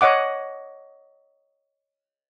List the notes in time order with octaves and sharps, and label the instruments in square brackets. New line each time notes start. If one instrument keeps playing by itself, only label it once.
[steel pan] C#5 D#5 F#5 D6